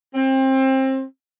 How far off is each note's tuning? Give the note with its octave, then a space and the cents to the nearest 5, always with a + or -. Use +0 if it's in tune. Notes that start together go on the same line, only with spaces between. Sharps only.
C4 +25